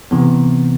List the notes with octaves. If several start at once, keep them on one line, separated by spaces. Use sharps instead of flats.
C3 E3 B3